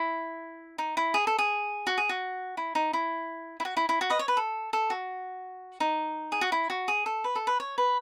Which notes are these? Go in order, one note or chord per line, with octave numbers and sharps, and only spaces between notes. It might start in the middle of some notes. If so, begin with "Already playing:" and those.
Already playing: E4
D#4
E4
G#4
A4
G#4
F#4
G#4
F#4
E4
D#4
E4
E4
F#4
E4
E4
F#4
B4 D#5
C#5
B4
A4
A4
F#4
D#4
G#4
F#4
E4
F#4
G#4
A4
B4
A4
B4
C#5
B4